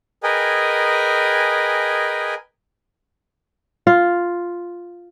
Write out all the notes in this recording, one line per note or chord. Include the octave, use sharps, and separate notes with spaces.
G#4 A#4 B4 D#5 G5 G#5
F4